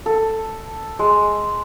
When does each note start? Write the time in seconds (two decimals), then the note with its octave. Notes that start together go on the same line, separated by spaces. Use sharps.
0.06 A4
0.99 G#3